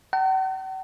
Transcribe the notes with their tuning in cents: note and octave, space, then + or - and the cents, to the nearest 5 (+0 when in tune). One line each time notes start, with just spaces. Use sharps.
F#5 +45 A5 +40